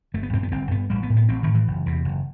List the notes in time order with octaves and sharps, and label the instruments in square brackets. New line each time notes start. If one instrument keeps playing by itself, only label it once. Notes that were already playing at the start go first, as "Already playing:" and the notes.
[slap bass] G1 A3
B3
G2 C4
B3
G1 C4
G2 B3
A1 G3
B3
A2
B3
A1 C4
A2 D#3
E3
F#1
E2 C3
F#1